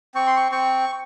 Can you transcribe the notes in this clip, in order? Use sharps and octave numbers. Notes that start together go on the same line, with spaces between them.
C4 C#6
C6
C#6
C4 C#6